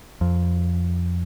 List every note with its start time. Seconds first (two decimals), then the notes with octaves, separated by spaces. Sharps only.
0.21 F2